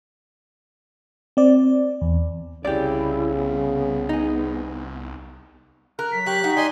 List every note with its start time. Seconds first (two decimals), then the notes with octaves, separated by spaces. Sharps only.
1.37 C4 D5
2.01 E2
2.65 C2 C#3 E4 G4 D5
3.36 B3
4.09 D#4 G#4
5.99 A#4 F#6
6.12 F#3 B6
6.26 G4 C#5 F#6
6.44 D#4 F#4
6.57 D5 D#5 G#5 C6